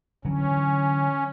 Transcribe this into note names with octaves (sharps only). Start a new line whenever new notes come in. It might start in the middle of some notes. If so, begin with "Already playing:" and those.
D3 E3 F#3 C#4